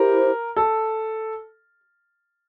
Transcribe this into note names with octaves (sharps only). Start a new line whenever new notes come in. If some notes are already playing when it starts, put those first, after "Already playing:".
Already playing: E4 G4 A#4 C5
A4